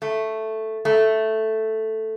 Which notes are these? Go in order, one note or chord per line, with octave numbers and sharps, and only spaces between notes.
A3
A3